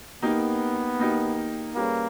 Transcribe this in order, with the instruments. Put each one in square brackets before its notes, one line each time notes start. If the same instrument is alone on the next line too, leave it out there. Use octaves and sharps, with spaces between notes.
[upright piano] A#3 D#4 G4 [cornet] B3
[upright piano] A#3 D#4 G4
[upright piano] G3 C#4 G#4 B4 [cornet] A#3